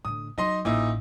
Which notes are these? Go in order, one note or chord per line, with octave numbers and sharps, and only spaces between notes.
A2 D3 D#6
F#3 D#4 D#5 C6
A1 A#2 D#4 E4